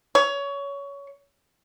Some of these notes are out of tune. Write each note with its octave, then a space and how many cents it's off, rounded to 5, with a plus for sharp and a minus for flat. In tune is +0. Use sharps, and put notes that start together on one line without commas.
C#5 +20